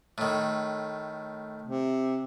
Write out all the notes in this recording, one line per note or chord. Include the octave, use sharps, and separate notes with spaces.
A2 D#3
C3